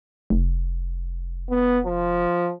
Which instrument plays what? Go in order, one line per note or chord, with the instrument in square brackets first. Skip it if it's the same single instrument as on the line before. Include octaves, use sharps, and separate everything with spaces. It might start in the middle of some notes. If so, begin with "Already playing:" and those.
[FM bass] F1
[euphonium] B3
F3